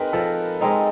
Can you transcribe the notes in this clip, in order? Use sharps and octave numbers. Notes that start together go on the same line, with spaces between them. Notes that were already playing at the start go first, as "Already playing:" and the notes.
Already playing: G#3 C4 D#4 A#4 B4
F3 A4
G#3 C4 D#4